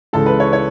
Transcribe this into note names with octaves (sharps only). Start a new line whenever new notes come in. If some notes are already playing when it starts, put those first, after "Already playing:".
C#2 C#3 E3 G#3 A4
B4
C#5
C#5